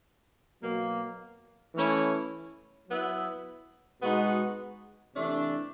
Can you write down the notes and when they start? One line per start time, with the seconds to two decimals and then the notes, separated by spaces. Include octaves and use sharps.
0.61 B2 F#3 A#3
1.74 E3 A3 C#4 E4
2.88 F#3 B3 E4
4.02 B2 G#3 B3 D#4 F#4
5.15 C3 E3 A3 D4